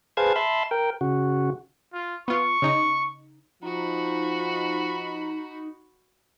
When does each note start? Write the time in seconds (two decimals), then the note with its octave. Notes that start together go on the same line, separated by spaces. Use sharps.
0.17 G#4 B4 C5 F5 A5 G#6
0.36 E5 A5 B5 C6
0.71 A#4 G5
1.01 C#3 F#4
1.94 F4
2.28 B3 F4 C#6
2.62 C#3 D#4
3.62 F3 D#4 F#4 B5